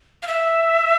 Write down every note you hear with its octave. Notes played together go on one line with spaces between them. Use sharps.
F5
E5